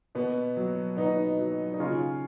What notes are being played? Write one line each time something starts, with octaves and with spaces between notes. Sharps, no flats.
B2 B3
F#3
B2 B3 D#4
F#3
D#4
C#3 C#4 F4